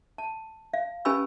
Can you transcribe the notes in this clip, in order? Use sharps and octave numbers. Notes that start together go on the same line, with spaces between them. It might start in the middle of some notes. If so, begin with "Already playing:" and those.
A5
F5
C#4 G4 B4 G#5 B5 E6